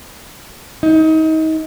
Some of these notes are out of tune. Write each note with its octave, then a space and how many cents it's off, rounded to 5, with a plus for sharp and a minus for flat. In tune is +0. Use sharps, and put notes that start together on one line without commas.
D#4 +30